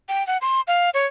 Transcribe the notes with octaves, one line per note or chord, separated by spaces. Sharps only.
G5
F#5
C6
F5
C#5